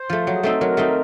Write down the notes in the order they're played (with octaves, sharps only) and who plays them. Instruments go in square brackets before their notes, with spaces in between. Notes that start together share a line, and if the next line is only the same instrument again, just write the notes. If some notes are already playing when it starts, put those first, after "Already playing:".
Already playing: [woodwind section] C5
[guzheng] F3 A3
F#3
[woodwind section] G#4
[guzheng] A3 C4 D#4 [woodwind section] A4
[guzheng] F#3 [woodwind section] A#4
[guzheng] A3 C4 D#4